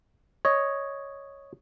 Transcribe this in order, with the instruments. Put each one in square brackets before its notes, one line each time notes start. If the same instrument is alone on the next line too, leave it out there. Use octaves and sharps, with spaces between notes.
[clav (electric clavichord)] C#5 D#5